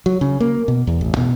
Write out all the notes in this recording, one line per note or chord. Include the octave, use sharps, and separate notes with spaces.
F#3
C#3
A#3
B2
E2
A1
B2